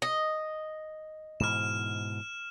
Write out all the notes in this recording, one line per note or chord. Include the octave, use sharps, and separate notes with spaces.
D#5
G#2 B2 E3 F6 E7